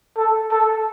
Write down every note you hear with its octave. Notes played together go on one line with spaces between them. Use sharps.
A4
A4